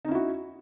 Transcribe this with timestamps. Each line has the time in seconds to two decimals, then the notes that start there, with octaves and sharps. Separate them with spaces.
0.05 D#4
0.08 C#4
0.11 E4
0.15 F#4